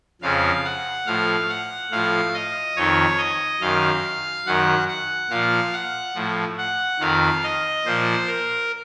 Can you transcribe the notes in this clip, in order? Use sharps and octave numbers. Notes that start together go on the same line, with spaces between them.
F2 C#3 F3 F5
F#5
A2 F3 F5
F#5
A2 F3 F5
D#5
F2 D#3 C#5
D#5
F#2 D#3 F5
F#2 D#3 F#5
F#5
A#2 F3 F5
F#5
A2 F3
F#5
F2 D#3 F5
D#5
A#2 F3 C5
A#4